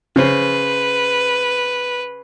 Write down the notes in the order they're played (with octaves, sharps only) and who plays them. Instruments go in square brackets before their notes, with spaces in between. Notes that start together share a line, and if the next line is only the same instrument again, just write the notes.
[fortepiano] C#3 C5 [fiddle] B4